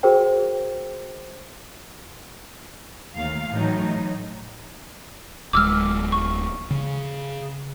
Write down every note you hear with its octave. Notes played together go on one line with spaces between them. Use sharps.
F#4 G#4 A#4 C5 G5
D#2 A3 F5
A2 E3 F#3 D#4
D1 G#3 D6 E6 F6
C#6
C#3